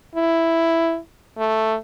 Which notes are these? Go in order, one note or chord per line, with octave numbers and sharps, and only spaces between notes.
E4
A3